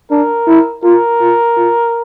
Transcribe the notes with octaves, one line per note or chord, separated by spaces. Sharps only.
D4 A#4
E4
F4 A#4
F4
F4